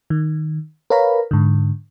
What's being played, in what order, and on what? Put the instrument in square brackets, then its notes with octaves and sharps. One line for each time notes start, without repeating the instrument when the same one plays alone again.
[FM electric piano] D#3
A#4 B4 C#5 F5 A#5 B5
G#2 D3